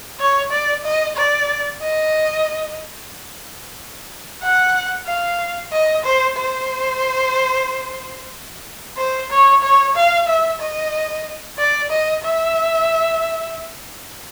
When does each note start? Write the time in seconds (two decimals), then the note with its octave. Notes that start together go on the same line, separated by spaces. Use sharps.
0.19 C#5
0.51 D5
0.84 D#5
1.16 D5
1.81 D#5
4.42 F#5
5.06 F5
5.72 D#5
6.04 C5
6.37 C5
8.97 C5
9.30 C#5
9.62 C#5
9.95 F5
10.27 E5
10.60 D#5
11.58 D5
11.90 D#5
12.22 E5